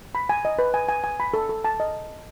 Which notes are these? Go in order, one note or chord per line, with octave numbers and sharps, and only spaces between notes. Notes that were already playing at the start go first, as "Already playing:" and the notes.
B5
G#5
D#5
B4
G#5
G#5
G#5
B5
A4
A4
A5
D#5